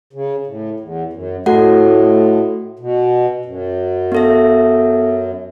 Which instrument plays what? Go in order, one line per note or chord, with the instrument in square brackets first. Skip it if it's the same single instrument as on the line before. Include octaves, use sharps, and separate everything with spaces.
[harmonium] C#3
A2
E2
F#2
[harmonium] A2 [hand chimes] A3 F#4 A4 F#5
[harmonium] B2
F#2
[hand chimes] B3 A4 E5